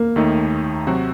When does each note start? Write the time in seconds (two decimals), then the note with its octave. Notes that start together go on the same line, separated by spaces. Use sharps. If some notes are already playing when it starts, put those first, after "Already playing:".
Already playing: A#3
0.16 D#2 D#3 A3 D#4
0.87 C3 F#3 C4 F#4